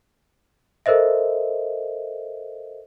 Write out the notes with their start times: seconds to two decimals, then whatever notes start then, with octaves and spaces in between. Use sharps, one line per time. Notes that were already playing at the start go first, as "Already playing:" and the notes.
0.86 A4 A#4 C5 D#5 E5